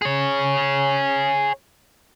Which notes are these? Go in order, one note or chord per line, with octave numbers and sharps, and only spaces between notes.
G#4 C#5